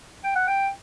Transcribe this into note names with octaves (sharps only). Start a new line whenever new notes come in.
G5
F#5
G5